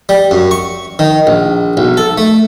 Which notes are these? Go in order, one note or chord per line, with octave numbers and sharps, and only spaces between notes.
G3
F#2
C#6
D#3
A#1
B1
A4
A3